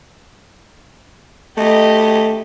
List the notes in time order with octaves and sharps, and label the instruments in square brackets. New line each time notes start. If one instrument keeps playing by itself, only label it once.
[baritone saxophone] A3 [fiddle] G4 D#5